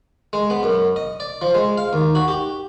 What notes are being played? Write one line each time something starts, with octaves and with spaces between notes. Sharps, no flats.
G#3
B3
F#2
D#5
D5
F3
G#3
F5
D#2
F#4
G4